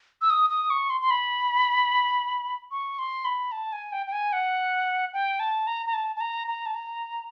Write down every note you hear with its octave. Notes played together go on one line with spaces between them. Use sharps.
E6
D#6
D#6
C#6
C6
C6
B5
C#6
C6
B5
A5
G#5
G5
G5
G#5
F#5
G5
A5
A#5
A#5
A5
A5
A#5
A#5
A5
A#5